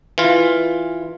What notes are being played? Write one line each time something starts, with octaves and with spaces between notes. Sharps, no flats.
E3 F4